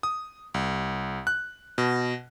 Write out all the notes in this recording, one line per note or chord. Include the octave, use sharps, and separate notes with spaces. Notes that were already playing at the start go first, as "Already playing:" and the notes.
D#6
C2
F#6
B2